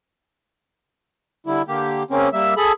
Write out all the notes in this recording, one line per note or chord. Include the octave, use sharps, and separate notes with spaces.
D3 G3 E4
D3 A#3 G4
C#3 A#3 C4 C#4
G3 A#3 E5 E6
G#4 A4 B5